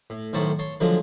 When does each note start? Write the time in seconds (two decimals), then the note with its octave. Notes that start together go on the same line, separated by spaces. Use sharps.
0.10 A2
0.33 B1 A2 D#3 C5 A5 C#6
0.59 C#5 A5 C6
0.80 D3 F3 F#3 G#3 A3